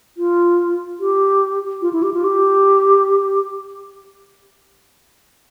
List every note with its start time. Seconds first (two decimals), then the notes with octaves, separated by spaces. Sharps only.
0.17 F4
1.00 G4
1.82 F4
1.93 E4
2.03 G4
2.13 F4
2.24 G4